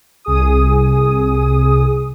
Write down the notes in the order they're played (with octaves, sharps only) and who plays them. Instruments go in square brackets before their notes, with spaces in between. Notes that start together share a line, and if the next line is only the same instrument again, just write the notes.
[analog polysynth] C2 G#4 D#6